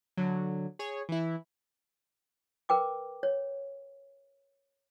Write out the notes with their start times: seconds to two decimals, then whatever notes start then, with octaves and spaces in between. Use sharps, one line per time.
0.17 D3 F#3
0.79 G#4 C#5
1.09 E3 E4
2.69 A#4 B4 G5 D6
3.23 C#5